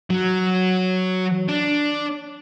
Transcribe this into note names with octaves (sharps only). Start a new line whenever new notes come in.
F#3
D4